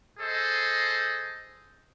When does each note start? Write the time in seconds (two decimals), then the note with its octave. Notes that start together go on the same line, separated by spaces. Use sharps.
0.20 G#4 A4 C5 D#5